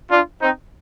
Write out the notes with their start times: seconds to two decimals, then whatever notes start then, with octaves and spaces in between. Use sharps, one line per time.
0.11 D4 F4
0.41 C4 D#4